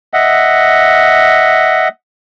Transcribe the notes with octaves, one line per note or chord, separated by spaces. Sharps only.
D#5 E5 F#5